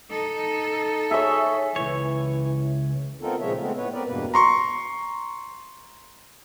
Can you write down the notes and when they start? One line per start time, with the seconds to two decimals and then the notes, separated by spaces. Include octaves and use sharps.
0.10 D#4 A4
1.11 G#4 C#5 E5
1.76 C#2 E3 C#5
3.20 B3 C4 D#4 F4 A4 A#4
3.40 A#2 C#3 F3 G#3 C#5 E5
3.60 G#3 A3 B3 C4
3.77 A2 B3 B4 C#5
3.93 B3 C4 A#4 B4 D5
4.07 E2 G2 B2 A#3 B4
4.34 A#5 C6 C#6